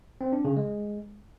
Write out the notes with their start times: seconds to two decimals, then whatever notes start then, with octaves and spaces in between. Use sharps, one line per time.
0.21 C4
0.33 D4
0.45 C#3
0.57 G#3